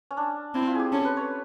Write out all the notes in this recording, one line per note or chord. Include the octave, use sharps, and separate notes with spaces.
C#4
D4
C4 E4
F4
G4 G#4
C#4 A4
B4
C#5